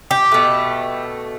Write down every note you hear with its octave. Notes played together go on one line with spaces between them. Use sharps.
G4
B2 A3